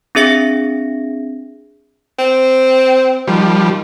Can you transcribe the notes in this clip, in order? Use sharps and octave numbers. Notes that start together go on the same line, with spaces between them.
C4 D4 G#4 E5 A#6 C#7
C4
D#3 F3 G3